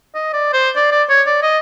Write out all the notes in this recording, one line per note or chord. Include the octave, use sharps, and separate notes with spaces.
D#5
D5
C5
D5
D5
C#5
D5
D#5